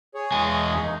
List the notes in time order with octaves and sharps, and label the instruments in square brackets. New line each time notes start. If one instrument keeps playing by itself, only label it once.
[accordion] G#4 C#5
[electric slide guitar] E2 G#3 G#5
[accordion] A#3 D#4